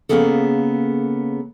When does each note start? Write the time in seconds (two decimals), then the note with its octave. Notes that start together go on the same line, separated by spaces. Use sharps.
0.09 C#3 G#3 A#3 B3 G#4 A4